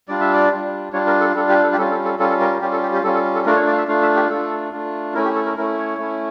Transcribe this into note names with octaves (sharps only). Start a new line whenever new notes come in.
G3 D4 F4 D5
E5
D5
G3 D4 F4
G3 D4 F4 C#5
A#4
A4
G3 D4 F4 A4
G4
A4
G4
G3 C#4 F4 A4
A4
A4
G3 C#4 F4 A4
A4
A#4
A#4
G3 C#4 F4 G4
A4
G4
G4
G3 C#4 F4 A4
A4
A4
A3 D4 F4 A#4
C#5
D5
F5
E5
A3 D4 F4 F5
E5
G4
A3 D4 F4 A4
A3 D4 F4
A3 C#4 E4 A#4
G4
A4
A#4
A3 C#4 E4 A#4
C#5
A3 C#4 E4